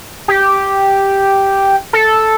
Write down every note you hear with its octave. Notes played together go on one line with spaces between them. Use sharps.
G4
A4